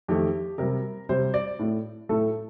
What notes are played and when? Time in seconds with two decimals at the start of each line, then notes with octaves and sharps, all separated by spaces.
0.08 F2 D#3 A3 G4
0.58 C3 G3 A#4
1.09 C3 G3 C5
1.34 D5
1.59 A2 A3
2.09 A2 A3 A4